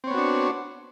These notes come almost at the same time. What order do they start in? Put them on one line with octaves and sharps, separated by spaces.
C4 C#5 B3 F#4 D4